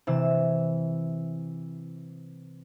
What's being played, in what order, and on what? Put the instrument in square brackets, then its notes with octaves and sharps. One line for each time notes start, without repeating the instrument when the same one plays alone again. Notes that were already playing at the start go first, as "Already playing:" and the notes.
[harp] C3 E3 E6